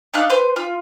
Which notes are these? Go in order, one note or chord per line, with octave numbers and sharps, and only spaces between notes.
D4 D#4 F5 F#6
B4 C5
F4